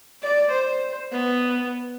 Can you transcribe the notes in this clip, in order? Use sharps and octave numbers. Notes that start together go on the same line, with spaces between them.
D5
C5
B3